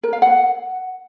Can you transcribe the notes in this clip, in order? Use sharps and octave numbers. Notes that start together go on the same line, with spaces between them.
A#4
F5
F#5